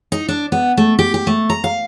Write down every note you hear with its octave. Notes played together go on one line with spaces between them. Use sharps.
D#4
D4
B3
A3
G4
G4
A3
A#5
F5